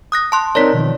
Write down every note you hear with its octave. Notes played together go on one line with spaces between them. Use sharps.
D#6 F#6 A#6
A5 C6 F#6
C4 D#4 A#4 C#5 D5 B6
B2 D#3 F3